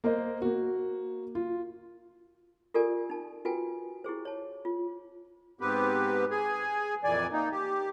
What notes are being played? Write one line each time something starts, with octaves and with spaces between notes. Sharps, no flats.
A#3 A#4 C5 D#5
A#3 F#4
F4
F4 G4 A4 A#4 D5 G#5
D#4 A5
F4 F#4 A4 B4 G5 G#5
E4 G4 G#4 C5
C#5 A5
F4
G#2 B3 C4 G4 B4
G#4 G#5
F2 A#2 E3 D5 G#5
A#3 D#4
G4